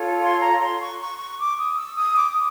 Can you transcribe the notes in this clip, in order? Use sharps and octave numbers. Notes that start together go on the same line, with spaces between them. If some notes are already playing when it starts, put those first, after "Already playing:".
Already playing: F4 A4 C#5
C6
A#5
C6
C#6
C#6
C#6
D6
D#6
E6
D#6
D6
D#6